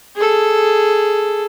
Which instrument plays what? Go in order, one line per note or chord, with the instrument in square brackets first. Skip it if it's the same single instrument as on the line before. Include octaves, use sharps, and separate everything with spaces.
[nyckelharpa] G#4 A4